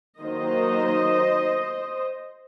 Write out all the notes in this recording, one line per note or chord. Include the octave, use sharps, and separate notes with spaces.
D#3 F#3 A#3 D#4 C5 D#5